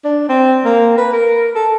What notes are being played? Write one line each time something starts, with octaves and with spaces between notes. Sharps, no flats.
D4
C4
A#3
B4
A#4
A4